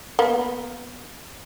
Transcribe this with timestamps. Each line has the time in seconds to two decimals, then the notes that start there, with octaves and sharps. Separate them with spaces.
0.19 A#3 B3